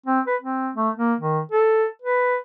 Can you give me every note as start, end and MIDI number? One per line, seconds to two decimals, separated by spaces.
0.06 0.20 60
0.27 0.36 71
0.42 0.70 60
0.75 0.90 57
0.97 1.14 58
1.20 1.40 51
1.52 1.86 69
2.02 2.37 71